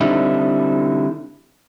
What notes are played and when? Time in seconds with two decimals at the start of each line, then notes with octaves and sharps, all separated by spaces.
0.01 D3 G3 C4 D#4 E4